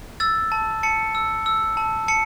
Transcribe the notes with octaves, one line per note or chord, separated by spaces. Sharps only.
E6 A6
A5
A5 C#7
E6
E6
A5
A5 C#7